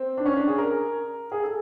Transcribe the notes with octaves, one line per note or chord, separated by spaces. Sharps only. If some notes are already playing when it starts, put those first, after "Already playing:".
Already playing: C4
D4
C#4
D4
G#4
A#4
G#4
A4